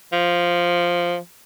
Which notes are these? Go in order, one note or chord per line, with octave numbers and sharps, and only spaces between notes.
F3